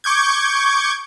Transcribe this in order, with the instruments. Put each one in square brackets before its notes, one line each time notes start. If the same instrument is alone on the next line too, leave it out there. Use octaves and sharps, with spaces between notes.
[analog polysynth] C#6 D6 G6 G#6